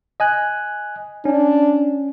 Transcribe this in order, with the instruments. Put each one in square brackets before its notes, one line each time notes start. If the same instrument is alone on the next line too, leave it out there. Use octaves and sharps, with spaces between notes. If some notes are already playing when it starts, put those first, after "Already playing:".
[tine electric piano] D#5 G#5 F#6
[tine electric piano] C#4 [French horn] D4